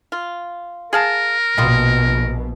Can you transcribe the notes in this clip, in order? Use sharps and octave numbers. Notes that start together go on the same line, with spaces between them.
F4
G#4 A#4 F5 A5
A#1 B2 G3 F4 D#5